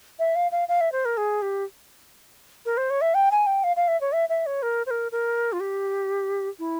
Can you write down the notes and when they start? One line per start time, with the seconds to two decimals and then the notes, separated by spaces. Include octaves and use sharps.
0.19 E5
0.36 F5
0.52 F5
0.68 F5
0.81 E5
0.92 C5
1.05 A#4
1.17 G#4
1.42 G4
2.66 A#4
2.77 C5
2.90 C#5
3.01 E5
3.14 G5
3.31 G#5
3.46 G5
3.64 F5
3.76 F5
3.88 E5
4.01 C#5
4.12 E5
4.29 E5
4.46 C#5
4.62 A#4
4.86 C5
4.91 A#4
5.12 A#4
5.52 F4
5.60 G4
6.59 E4